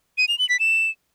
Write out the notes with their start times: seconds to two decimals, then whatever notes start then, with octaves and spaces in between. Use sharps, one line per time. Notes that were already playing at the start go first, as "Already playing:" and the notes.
0.18 D#7
0.28 F7
0.39 F#7
0.49 B6
0.60 E7